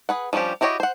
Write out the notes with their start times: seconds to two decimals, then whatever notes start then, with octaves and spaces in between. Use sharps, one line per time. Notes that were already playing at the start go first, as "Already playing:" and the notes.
0.09 G#4 B4 F#5
0.33 F3 G3 C#4 D4 G4
0.61 E4 F#4 G4 C#5 D#5
0.80 C5 F#5